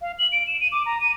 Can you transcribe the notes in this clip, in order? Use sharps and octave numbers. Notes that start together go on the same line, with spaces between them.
F5
F#7
D7
E7
D#7
D6
A#5
D#7